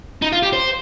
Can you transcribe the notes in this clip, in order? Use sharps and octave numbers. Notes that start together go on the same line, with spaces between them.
D#4
F4
G4
C5